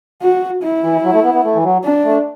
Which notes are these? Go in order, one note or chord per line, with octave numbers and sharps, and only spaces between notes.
F#4
E4
E3
F#3
A3
B3
B3
A3
E3
F#3
D4
A3